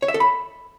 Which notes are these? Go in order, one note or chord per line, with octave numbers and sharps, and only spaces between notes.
C#5
E5
A4
B5